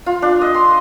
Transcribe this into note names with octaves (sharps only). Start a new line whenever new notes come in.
F4
D4
D#5
C6